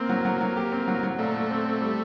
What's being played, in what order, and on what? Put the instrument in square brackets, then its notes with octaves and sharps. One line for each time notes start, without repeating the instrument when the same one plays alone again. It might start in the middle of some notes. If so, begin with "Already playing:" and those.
Already playing: [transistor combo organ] A#3 [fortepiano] C4
[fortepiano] F#3
F#3
F#3
G4
C4
F#3
F#3
[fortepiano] A#2 [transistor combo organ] A3
[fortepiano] A#2
C4
C4
G3